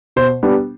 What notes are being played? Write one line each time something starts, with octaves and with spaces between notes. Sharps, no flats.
B2 C5
G3 B3 D4